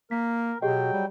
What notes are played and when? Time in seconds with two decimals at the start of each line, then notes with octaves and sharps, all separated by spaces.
0.11 A#3 A#4 B6
0.62 B2 F#3 G4 G#4 D#5 G5
0.93 G3